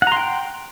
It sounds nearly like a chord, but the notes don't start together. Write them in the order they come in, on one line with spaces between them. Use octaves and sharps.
F#5 A#5 C6 G5